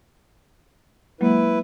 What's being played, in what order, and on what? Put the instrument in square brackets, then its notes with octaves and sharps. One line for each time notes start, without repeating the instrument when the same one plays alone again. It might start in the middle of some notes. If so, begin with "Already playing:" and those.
[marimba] F#3 G#3 A#3 [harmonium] E4 B4